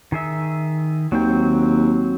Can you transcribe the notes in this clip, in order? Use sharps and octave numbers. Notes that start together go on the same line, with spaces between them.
D#3 G#4 E5
D#2 F#3 C4 G5